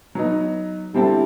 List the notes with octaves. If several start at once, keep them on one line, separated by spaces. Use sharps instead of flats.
F#3 B3 D#4
D3 G3 C4 E4 A4